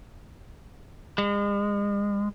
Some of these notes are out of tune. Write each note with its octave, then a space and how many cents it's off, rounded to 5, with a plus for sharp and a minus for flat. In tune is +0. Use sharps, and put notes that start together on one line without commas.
G#3 -40